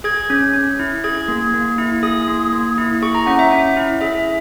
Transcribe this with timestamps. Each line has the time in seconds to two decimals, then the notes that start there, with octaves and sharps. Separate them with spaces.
0.04 G#4 G#6
0.30 C#4
0.54 C#4
0.79 E4
1.04 G#4 G#6
1.28 A#3
1.54 A#3
1.78 E4
2.03 G#4 D#6
2.28 A#3
2.53 A#3
2.78 E4
3.02 G#4 C#6
3.15 A#5
3.26 C#4 F#5
3.39 E5
3.52 C#4
3.77 E4
4.01 G#4 E5